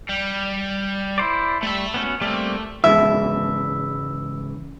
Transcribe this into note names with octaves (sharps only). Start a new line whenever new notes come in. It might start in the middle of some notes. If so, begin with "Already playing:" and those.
G3
E4 C5 D5
G3 A3 E5
B3 C#4 F#4
G3 A3 A#3 C4
C#2 G#2 E3 E5